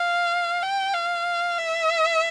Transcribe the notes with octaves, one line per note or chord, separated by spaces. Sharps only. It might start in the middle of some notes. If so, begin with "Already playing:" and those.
Already playing: F5
G5
F5
E5